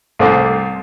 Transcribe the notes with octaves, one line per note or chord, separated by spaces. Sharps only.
C2 A3 C4 D6